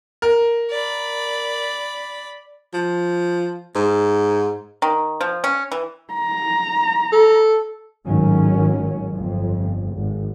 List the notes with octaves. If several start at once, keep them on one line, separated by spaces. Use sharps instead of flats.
A#4
D5 B5
F3
G#2
D#3
F3
C#4
E3
A#5
A4
G#1 A2 D#3 F#3 C#4
G1 F2
G#1